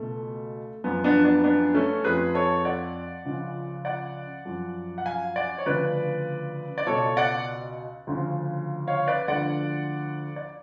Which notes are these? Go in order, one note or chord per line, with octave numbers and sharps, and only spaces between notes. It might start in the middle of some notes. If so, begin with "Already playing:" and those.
Already playing: C#2 B2 A3
F#2 F3 B3
B3 D4
B3 D4
B3 D4
A3 C#4
F2 F3 G#4 B4
A4 C#5
D5 F#5
C#2 C#3 F3
D5 F#5
F#2 F3
F#5
F5 G#5
D5 F#5
C#5
D2 C#3 F3 B4 D5
D5
C#2 B2 A4 C#5
D5 F#5
D2 C#3 F3
C#5 F5
B4 D5
D2 D3 F3 D5 F#5
D5